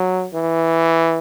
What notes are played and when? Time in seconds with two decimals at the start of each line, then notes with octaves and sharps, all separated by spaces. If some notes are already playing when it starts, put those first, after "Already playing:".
Already playing: F#3
0.34 E3